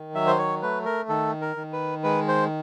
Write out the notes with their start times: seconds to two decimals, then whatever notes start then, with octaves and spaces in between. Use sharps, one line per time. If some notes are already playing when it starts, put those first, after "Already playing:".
Already playing: D#3
0.15 F#3 E5
0.27 C5
0.38 C#5
0.62 A3 B4
0.85 A#4
1.09 D#3 A4
1.41 A#4
1.56 D#3
1.73 B4
2.04 G#3 B4
2.28 C5